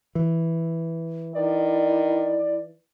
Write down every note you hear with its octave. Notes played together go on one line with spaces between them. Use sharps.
E3
D#3 E4 D5